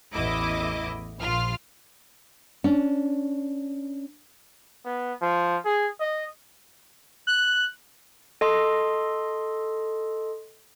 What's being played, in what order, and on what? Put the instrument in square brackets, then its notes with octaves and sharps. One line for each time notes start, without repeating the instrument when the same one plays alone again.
[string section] A1 E2 E4 D#5 D6
A#1 F4 F6
[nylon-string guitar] C#4 D4
[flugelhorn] B3
F3
G#4
D#5
[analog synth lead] F#6
[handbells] A4 D#5 C6